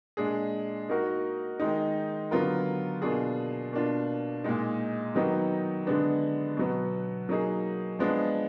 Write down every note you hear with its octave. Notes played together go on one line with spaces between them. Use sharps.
A#2 G#3 D4 G#4
A#3 D#4 F#4 A#4
D#3 G#3 D#4
D3 F#3 B3 F4 A#4
B2 A#3 D4 F4 G#4
B2 A#3 D4 F4
A#2 G#3 D#4
D#3 F#3 B3 D#4
D3 G#3 B3 D4
B2 F#3 B3
F#3 A#3 D#4 G#4
F3 G#3 B3 D4